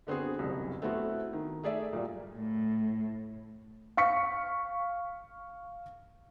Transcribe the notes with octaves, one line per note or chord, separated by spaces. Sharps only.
D3 B3 C4 F#4 G#4
F#1 C2
A3 B3 C4 E4 F#4
D#3
A3 G#4 D5 E5
A#2 G3
A2
F5 C#6 B6 C#7